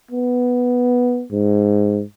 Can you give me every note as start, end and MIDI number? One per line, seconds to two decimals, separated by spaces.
0.11 1.24 59
1.32 2.03 44